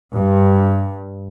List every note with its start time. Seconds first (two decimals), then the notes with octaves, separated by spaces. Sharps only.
0.14 G2